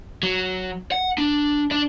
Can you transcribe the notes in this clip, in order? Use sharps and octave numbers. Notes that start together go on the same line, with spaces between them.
F#3
F#5
D4
D4 D5